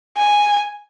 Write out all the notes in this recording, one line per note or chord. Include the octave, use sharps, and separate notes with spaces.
G#5